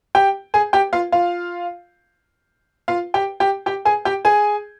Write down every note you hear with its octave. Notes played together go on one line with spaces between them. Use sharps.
G4 G5
G#4 G#5
G4 G5
F4 F5
F4 F5
F4 F5
G4 G5
G4 G5
G4 G5
G#4 G#5
G4 G5
G#4 G#5